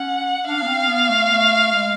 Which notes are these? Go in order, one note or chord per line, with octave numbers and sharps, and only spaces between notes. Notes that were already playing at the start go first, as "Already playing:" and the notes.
Already playing: C#4 F#5
D4 F5
B3
C4
B3
A3
A3
G#3